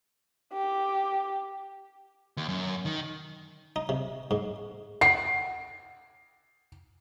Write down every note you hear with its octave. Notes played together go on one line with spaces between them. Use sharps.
G4
D#2
F#2
D#3
D#4
C3
G#2
F#5 G5 C7